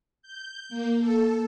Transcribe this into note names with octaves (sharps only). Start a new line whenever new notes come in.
G6
A#3
A4